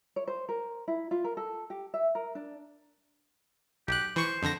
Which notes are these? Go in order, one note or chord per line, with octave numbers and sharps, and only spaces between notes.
C#5
C5
A#4
E4
F4
A#4
A4
G4
E5
A#4
D4
B1 G4 F#6
E3 C5 C#6 C#7
F2 D3 A#6